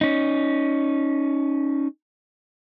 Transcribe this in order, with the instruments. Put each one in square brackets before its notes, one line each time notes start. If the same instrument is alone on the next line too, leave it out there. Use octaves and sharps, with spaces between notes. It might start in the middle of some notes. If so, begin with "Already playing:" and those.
[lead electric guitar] C#4 D#4